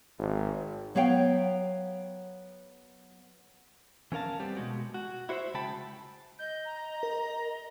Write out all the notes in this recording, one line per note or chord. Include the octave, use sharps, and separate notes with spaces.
G#1
F#3 B3 C#5 F5 G5
E3 C#4 A#4 F5 A5
G3 B3 C4 G4
B2 F3 G#3 F#4
F#4
E4 F#4 C5 D5 E5
C#3 G#3 G5 A5 B5
D#5 G6
A#5
A#4